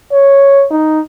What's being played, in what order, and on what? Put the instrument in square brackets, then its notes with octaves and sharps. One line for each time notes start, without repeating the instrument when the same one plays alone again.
[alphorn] C#5
D#4